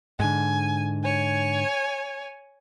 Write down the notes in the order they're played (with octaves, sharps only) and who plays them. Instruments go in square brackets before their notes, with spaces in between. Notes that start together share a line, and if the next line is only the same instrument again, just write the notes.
[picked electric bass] G#2 D3 [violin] G#5
[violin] C#5 G#5